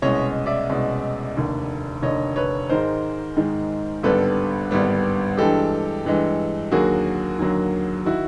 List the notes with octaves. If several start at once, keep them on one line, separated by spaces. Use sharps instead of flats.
C2 B2 G#3 C#4 C#5 D#5
D5 E5
C2 B2 G#3 C#4
F1 D#2 D3
F1 D#2 D3 C#5 D#5
B4 C#5
G#2 D#3 G#3 A#4 C5
G#2 D#3 G#3
G#1 G2 D3 G3 B3 A4 B4
G#1 G2 D3 G3 B3
G2 E3 G#3 G4 A4
G2 E3 G#3
D#2 D3 F#3 A#3 F#4 G#4
D#2 D3 F#3 A#3
D#3 E4 F#4